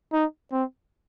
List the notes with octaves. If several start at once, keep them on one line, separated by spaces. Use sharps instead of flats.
D#4
C4